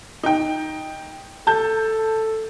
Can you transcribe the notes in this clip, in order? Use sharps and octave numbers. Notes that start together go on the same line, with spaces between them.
D#4 G5
A4 A5 G6